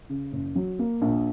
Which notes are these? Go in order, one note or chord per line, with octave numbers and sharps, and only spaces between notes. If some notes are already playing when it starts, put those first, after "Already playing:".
C#3
F#1
F#3
A#3
A#1